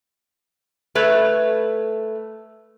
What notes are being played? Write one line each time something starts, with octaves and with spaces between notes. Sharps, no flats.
A3 B4 C#5